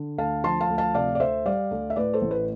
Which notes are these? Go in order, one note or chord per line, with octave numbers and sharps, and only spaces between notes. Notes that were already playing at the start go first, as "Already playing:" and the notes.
Already playing: D3
D2 F5 A5
F3 A5 C6
F5 A5
D2
F5 A5
C3 D5 F5
D5
D2 C5 E5
G3 D5 F5
D2
E5
A2 B4 D5
A4 C5
A1
B4